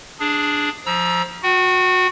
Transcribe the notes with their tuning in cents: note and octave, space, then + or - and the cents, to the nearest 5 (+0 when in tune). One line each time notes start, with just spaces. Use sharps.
D4 +0 G#4 +0
F3 +10 A#5 +25 E6 +0
F#4 -25 F#5 +45